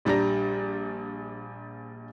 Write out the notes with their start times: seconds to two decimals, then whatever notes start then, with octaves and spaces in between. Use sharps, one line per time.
0.05 A#1 G3 D4 A#5 A#6